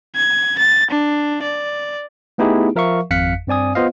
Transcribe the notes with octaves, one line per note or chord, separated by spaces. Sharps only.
G#6
A6
D4
D5
A3 B3 D#4 E4 G4 G#4
F3 A#4 E5 F5 C#6
G#1 F2 F5 F#6 B6 C#7
G2 C4 D5 G#5 D#6
B3 F4 C5 D#5 F5